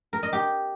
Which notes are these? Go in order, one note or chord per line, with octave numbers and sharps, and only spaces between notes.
A#4
D#5
G4